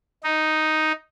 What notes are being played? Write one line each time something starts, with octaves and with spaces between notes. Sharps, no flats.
D#4